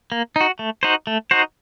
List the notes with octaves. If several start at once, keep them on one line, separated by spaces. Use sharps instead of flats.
A#3
D#4 F#4
A3
D#4 F#4 C5
A3
D#4 F#4 C5